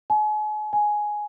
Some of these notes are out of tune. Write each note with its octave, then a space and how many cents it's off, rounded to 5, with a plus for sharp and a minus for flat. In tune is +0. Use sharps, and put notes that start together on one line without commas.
G#5 +40
G#5 +10